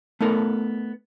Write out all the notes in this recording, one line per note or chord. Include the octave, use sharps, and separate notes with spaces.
A3 B3 D#4 A4 A#4